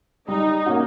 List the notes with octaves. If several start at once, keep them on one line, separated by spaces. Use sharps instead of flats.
G3 D#4
A#3 C#4 F#4